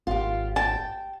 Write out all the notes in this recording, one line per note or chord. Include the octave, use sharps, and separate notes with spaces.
G#1 F4 G4
G5 A5